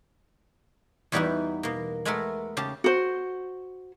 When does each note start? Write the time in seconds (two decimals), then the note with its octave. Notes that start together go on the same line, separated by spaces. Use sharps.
1.12 E2 E3 G3 B3 D#4 F#4
1.63 B2 A#3
2.05 G#3 A3 B3 A4 A#4
2.57 C#3 G4 A5
2.84 F#4 C5